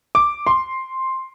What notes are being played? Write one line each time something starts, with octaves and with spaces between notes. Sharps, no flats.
D6
C6